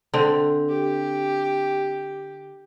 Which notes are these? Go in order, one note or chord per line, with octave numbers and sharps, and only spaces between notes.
D3 C4
G4